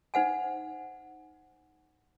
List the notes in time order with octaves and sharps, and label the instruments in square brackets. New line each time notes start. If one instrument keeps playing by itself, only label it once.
[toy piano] D#4 C5 F#5 G#5